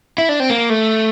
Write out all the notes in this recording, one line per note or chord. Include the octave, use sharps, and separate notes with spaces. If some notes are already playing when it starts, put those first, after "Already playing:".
E4
D4
C4
A#3
A3